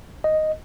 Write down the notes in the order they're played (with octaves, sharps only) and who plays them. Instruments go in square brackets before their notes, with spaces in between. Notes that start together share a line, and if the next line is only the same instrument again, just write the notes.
[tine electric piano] D#5